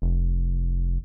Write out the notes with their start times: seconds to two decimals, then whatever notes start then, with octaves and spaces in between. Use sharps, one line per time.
0.02 F1